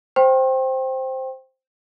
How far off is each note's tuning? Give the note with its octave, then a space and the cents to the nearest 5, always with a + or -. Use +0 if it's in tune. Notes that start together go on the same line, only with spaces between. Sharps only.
C5 +0 G5 +0 C6 +45